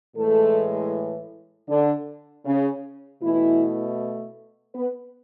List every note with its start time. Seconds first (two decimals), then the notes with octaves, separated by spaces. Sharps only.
0.16 A2 E3 G#3 A3 A4
1.69 D3 D4
2.46 C#3 C#4
3.22 B2 E3 A3 E4
4.75 B3 B4